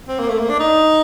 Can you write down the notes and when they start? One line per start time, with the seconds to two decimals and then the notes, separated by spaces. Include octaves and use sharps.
0.08 C4
0.19 A#3
0.28 A3
0.39 A#3
0.49 D4
0.60 D#4